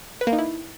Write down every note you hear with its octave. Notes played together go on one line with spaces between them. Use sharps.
B4
A#3
D#4
E4